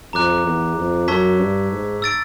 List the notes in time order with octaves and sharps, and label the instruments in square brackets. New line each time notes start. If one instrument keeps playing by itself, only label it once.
[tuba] F2 [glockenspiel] A#5 D6 F#6
[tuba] E2
F2
[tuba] F#2 [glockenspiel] A5 C#6 E6 G#6 B6
[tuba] G2
G#2
[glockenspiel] E6 A6 D7